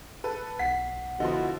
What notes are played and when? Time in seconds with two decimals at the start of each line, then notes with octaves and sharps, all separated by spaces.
0.24 A4 B4
0.59 B1 F#5 B6 C7
1.20 D3 F3 B3 E4 F#4 D#5 C6